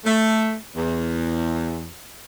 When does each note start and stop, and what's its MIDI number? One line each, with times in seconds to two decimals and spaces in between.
0.05 0.54 57
0.76 1.86 40